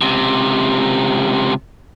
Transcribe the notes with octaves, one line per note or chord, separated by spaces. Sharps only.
C#2 C3